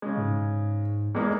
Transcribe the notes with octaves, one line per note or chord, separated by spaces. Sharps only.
C#3 G#3
G#2
E2 G#3 A#3